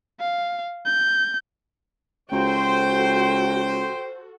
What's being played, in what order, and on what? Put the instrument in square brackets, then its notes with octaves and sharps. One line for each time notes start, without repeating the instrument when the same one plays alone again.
[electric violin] F5
G6
[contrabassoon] C#2 [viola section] F#4 A4 [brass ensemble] C5 [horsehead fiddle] G5